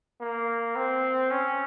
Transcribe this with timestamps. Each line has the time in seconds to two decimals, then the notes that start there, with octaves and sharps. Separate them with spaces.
0.20 A#3
0.76 C4
1.31 C#4